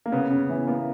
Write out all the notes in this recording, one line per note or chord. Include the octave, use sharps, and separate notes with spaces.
A#3
C#3 B3
C#3
E3
A#3 B3